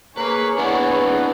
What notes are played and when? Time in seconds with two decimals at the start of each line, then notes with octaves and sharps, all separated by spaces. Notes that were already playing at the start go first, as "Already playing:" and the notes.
0.17 A#3 G#4 B4 C#5
0.58 B3 D4 E4